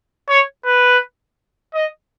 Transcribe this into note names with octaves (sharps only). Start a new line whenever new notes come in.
C#5
B4
D#5